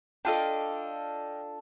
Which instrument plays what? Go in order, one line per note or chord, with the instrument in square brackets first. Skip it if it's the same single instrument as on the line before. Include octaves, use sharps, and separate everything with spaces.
[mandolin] D4 F4 A4 [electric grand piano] D#5 F5 G5